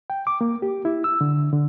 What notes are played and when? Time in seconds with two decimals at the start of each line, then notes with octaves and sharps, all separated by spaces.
0.10 G5
0.27 D6
0.41 A#3
0.62 G4
0.85 E4
1.04 E6
1.21 D3
1.53 D3